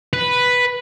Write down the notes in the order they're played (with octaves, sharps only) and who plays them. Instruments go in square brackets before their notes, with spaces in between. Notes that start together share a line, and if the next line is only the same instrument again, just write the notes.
[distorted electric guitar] B4